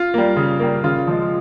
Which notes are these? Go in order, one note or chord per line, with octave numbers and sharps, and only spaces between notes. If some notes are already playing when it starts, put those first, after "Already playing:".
Already playing: F4
G3 A#3
C#3
G3 A#3
C#3 F4
F3 G#3